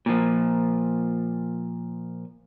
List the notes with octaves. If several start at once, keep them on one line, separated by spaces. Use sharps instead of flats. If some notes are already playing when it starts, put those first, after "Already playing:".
A#2 F3